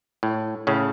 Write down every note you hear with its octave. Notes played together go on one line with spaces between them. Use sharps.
A2
A2 C#3